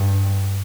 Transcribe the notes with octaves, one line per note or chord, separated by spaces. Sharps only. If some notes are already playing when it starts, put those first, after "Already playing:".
Already playing: G2